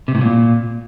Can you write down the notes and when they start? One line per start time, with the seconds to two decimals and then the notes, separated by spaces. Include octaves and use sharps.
0.08 C3
0.15 A2
0.21 A#2